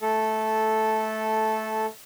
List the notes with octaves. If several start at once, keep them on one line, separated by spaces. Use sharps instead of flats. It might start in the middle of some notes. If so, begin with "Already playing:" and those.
A3 A4